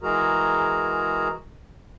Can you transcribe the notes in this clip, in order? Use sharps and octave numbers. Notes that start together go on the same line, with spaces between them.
E3 G#3 F#4 G#4 A#4 A#5